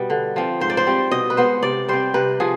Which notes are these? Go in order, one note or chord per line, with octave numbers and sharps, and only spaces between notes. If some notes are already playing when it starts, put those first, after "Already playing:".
Already playing: B2 G3 B3
D3
F3 C4
G#2 C5
D5
C5
G3 C4
B2 D#5
B4
G#3 B3 C5
C3 D5
G3 C4 C5
C3 B4
F3 G#4